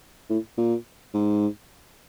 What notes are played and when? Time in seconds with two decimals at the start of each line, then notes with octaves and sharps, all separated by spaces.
0.30 A2
0.58 A#2
1.14 G#2